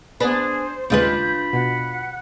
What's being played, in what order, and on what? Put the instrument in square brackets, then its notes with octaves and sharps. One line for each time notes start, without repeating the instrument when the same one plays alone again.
[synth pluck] B3 B4 [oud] D4 [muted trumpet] G#4 [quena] C5
[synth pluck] D#2 C#3 G#3 [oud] D4 F4 B4 [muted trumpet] B5 [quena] G6
[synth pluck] B2 [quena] F#5